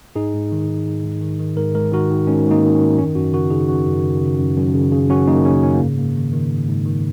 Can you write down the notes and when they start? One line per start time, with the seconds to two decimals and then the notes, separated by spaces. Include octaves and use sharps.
0.15 G#2 D#4 G#4
0.34 G#2
0.52 D#3
0.69 D#3
0.86 G#2
1.04 G#2
1.21 D#3
1.39 D#3
1.57 G#2 A#4
1.75 G#2 A#4
1.92 D#3 F#4 A#4
2.10 D#3
2.27 G#2 C#4
2.45 G#2
2.51 A#3 D#4
2.63 D#3
2.75 C#4
2.81 D#3
2.98 F#2 C#4
3.15 F#2 C#4 F#4
3.33 C#3 F#4 A#4
3.50 C#3 D#4 G#4
3.68 F#2 C#4 F#4
3.87 F#2
4.03 C#3
4.21 C#3
4.39 F#2
4.57 F#2
4.74 C#3
4.92 C#3
5.09 F#2 C#4 F#4
5.27 F#2 A#3 D#4
5.45 C#3 C#4
5.62 C#3 C#4
5.74 A#3
5.80 G#2
5.98 G#2 A#3
6.16 D#3
6.33 D#3
6.50 G#2
6.68 G#2
6.86 D#3